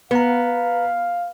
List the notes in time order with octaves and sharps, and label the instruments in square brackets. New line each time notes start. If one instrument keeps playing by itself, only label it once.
[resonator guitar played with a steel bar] B3 [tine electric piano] B4 A#5 [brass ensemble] F5